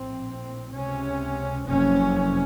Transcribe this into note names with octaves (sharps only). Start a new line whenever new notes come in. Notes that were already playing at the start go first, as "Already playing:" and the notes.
Already playing: A#1 A2 C4
C#2 C3 C#4
F#1 F2 C3 C#4